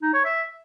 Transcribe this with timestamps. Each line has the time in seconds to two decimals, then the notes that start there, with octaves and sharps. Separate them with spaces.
0.02 D#4
0.14 C#5
0.25 E5